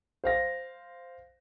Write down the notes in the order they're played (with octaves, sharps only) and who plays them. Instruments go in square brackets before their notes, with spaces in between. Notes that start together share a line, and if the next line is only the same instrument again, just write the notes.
[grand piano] C5 F5 A#6